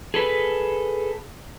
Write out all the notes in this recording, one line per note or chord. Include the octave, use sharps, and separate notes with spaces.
G#4 A4 B4